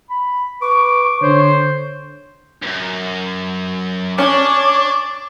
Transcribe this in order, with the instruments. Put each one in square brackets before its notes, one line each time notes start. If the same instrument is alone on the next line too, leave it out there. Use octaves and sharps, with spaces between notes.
[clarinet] B5
[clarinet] B4 [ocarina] C#6 [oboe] D6
[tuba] D3 [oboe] C5 [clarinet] C#5
[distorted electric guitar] C#2 F#2
[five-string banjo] C#4 [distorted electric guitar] D4 [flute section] C#5 D6 [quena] C#6